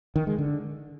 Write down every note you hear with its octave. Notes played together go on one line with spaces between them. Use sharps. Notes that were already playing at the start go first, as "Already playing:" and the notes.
D#3
G#3
D3